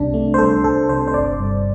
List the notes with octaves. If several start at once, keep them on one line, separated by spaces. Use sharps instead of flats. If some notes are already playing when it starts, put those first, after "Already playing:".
Already playing: C2 C3 D4
A3
C5
C2 A4
C2 A4
C3 C5
C5
G1 D5
G2